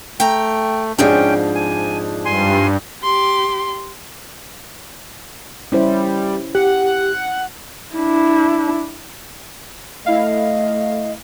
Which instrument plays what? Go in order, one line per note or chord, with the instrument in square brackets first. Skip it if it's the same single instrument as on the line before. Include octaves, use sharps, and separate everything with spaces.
[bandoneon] A3 [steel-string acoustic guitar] G5 A#5
[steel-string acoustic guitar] F2 G#2 F3 [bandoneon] C#4 G5 [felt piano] D4 G#4 D5
[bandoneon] G#5
[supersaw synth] G2 [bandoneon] G#5 C6
[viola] G4 C6
[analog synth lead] G3 [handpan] C#4 E4 C5
[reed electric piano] G4 [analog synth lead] F#5
[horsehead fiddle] D4 E4
[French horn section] A3 [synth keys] E4 F5 [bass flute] D#5